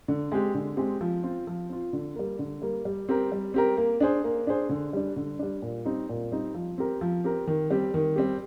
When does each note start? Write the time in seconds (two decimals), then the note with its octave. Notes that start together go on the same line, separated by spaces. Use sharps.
0.08 D3
0.32 G#3 C4 G4
0.55 D3
0.77 G#3 C4 G4
1.01 F3
1.23 C4 F4
1.47 F3
1.69 C4 F4
1.93 D3
2.16 G3 A#3
2.39 D3
2.62 G3 A#3
2.85 G3
3.09 C4 G4 A#4
3.32 G3
3.54 C4 G4 A#4
3.77 A#3
4.00 D4 G#4 C5
4.24 A#3
4.47 D4 G#4 C5
4.69 D3
4.93 G3 D4
5.16 D3
5.39 G3 D4
5.62 A#2
5.85 G3 C4 D#4
6.09 A#2
6.32 G3 C4 D#4
6.54 F3
6.78 C4 G4 A#4
7.01 F3
7.24 C4 G4 A#4
7.47 D#3
7.70 G3 C4 G4
7.94 D#3
8.16 G3 C4 G4